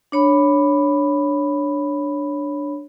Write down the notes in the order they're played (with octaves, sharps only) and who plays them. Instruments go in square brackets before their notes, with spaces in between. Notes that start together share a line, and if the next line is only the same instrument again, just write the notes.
[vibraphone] D4 C#5 B5